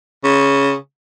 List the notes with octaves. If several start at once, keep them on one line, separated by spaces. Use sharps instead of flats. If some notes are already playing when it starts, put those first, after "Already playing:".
C#3